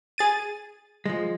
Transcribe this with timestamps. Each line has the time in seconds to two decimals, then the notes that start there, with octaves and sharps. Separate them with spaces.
0.18 G#4 A6 D#7
1.06 F3 G#3